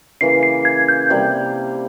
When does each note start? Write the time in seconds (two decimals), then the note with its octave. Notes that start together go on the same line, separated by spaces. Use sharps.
0.21 C#3 E3 A#3 C7
0.43 C7
0.65 G#6
0.88 G6
1.10 C3 G3 A#3